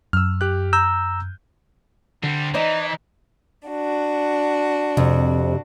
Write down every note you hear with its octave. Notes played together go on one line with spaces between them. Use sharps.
F#2 E6 F6
G4 F#6
A#5 E6 G6
D3 G3 C4
E3 D#4 C5 D5 D#5
D4 F#4
F2 C3